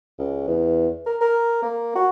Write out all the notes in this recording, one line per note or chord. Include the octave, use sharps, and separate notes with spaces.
C#2
E2
A#4
A#4
A#3
F#4